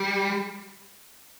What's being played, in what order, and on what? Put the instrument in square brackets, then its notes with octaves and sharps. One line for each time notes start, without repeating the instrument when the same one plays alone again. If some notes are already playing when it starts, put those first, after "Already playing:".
Already playing: [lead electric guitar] G3